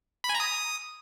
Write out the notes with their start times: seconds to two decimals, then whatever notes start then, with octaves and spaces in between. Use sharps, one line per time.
0.24 B5
0.29 G#5
0.35 A#5
0.40 D#6